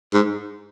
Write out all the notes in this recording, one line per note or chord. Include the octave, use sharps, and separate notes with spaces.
G#2